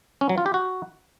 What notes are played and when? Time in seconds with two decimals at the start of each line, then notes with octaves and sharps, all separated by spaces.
0.21 C#4
0.29 F#3
0.38 F4
0.46 G4
0.54 F#4